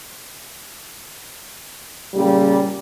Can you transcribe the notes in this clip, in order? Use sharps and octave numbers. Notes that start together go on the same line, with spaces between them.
A#2 C#3 G3